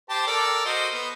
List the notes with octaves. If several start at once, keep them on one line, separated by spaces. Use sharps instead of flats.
G4 C5 A5
A4 A#4 D5
F#4 C5 D#5
B3